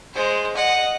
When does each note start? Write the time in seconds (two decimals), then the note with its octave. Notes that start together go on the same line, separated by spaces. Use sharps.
0.13 G#3 C5
0.55 D#5 F#5